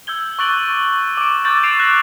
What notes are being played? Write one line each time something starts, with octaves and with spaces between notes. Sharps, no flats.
E6 G6 G#6 G7
C#6 D6 F#6 A6 D7 F#7
D6 D7
C#6 E6 G6 A6 F#7
C7 D7 E7 F7
F#6 A#6